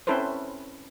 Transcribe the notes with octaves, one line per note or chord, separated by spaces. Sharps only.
C4 C#4 E4 A4 B4 C5